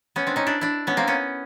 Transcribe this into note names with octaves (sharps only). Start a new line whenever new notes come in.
B3 C#4
C4 D4
C#4 D#4
D4 E4
D4 E4
B3 C#4
A#3 C4
B3 C#4